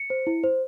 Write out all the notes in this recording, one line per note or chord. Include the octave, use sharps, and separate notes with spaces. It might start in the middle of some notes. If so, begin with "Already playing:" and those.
Already playing: C#7
C5
E4
C5